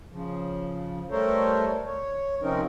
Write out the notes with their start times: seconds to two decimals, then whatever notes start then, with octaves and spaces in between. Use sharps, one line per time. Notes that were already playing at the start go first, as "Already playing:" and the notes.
0.12 C#3 F3
1.11 G3 A3 A4 A#4 C5 C#5
1.86 C#5
2.42 C3 F3 C4 C#4 D#4 A#4